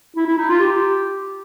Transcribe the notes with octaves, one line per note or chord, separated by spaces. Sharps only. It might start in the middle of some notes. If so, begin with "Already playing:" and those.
E4
E4
D#4
F4
G4